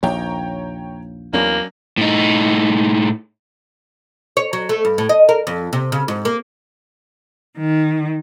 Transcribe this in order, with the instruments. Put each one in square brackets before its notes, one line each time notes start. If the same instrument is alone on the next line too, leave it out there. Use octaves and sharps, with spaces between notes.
[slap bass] A#1 D#2 [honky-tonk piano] C#5 G5 A#5
[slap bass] E2 [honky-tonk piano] F#3 C#4 D4 [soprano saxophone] A#3
[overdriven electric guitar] A2 D#4
[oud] C#5
F#3
A3
G2
A2
D#5
A#4
F2
C3
C#3
G#2
A#3
[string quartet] D#3